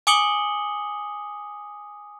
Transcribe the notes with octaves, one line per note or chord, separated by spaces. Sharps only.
G#5 D6 D#6 C#7 F#7 G7